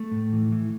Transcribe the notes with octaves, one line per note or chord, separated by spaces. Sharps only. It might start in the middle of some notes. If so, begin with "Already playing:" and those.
Already playing: A3
A2
E3
E3